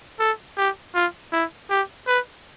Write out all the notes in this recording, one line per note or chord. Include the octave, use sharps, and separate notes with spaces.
A4
G4
F4
E4
G4
B4